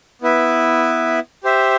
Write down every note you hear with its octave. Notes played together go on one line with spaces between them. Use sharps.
B3 E4 B4 E5
G4 C5 E5